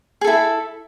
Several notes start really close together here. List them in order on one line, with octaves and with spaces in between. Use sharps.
G#4 A4 E4